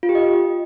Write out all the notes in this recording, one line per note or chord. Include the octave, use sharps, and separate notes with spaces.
F4
G4
D#5